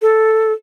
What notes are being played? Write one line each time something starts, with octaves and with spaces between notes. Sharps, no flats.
A4